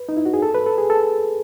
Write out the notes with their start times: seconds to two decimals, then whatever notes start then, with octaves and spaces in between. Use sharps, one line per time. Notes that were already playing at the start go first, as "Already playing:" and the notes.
Already playing: B4
0.09 D#4
0.17 E4
0.26 F#4
0.34 G#4
0.42 A4
0.55 B4
0.66 A4
0.78 G#4
0.90 A4